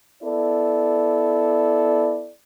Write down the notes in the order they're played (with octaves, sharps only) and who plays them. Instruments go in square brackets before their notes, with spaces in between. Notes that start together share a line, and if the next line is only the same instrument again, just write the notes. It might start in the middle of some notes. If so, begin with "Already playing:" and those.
[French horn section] B3 E4 A4 D5